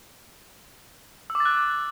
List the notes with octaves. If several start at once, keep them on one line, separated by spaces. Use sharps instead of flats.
E6
D6
A6
F#6